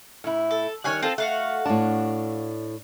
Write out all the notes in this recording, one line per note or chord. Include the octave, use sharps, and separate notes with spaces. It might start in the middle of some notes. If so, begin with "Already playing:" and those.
A2 E4
A4
D#3 G3 C#5 G#5 F#6
C4 F4 A4
A3 F#4 F5 F#5
A2 D4 A5